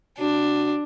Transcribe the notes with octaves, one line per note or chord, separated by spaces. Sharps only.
C3 D4 F#4